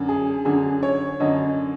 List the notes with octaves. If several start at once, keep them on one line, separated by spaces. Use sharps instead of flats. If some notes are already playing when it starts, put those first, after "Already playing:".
Already playing: F#2 D3
G#4
F#2 D3 G#4
C#5
F#2 D3 D#5